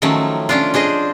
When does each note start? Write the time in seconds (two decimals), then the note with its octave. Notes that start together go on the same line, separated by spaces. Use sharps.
0.02 D#3 F3 F#3 A3 C#4
0.49 C#4 D4 F4
0.74 D4 G#4 C5 D#5